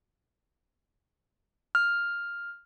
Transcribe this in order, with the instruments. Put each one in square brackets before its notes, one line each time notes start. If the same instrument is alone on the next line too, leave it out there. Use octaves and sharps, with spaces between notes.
[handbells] F6